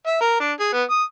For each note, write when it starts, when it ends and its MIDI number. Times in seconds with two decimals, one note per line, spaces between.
0.07 0.17 76
0.21 0.37 70
0.40 0.52 62
0.60 0.69 68
0.73 0.83 59
0.90 1.03 87